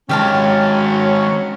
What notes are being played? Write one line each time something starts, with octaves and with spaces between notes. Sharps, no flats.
D#3 F#3 G#3 C#4 G4 F5 A5